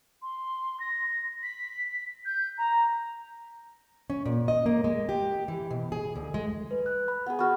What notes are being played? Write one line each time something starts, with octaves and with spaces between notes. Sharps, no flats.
C6
A#6
B6
G6
A#5
C#4
A#2
D#5
A#3
G#3
G4
E3
B2
G#4
D2
G#3
B4
F#6
B5
B3 G#4
B3 F#4 C#6 F6